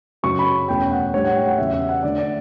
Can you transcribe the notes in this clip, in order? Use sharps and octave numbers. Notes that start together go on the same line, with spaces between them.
F#2 C#3 F#3 C#6
B5
E2 B2 A3 C#4 G5
F#5
A2 G3 D4 C#5
F#5
G5
F#5
E2 C#3 F#3 E5
E5
F#5
D3 A3 D4 D5
D5